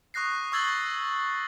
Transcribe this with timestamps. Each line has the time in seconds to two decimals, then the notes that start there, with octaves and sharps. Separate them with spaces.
0.14 C#6 D#6 F#6 A#6 C7
0.52 C#6 E6 G#6 A6 F#7 G7